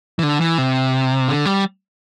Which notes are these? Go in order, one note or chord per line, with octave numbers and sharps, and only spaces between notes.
E3
D3
E3
C3
D3
G3